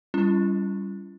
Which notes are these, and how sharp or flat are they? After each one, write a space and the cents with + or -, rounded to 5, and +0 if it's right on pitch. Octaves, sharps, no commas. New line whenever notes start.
G3 +0 C#4 +20 F4 -40